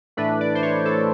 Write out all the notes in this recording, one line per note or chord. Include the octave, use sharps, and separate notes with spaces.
A2 E3 A3 D4 B4
D5
C5
C#5
A4